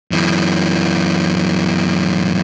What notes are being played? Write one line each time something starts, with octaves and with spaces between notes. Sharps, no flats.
F#2 E3